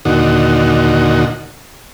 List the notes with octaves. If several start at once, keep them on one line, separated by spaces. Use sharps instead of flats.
D#2 A#2 D3 D#4 F#4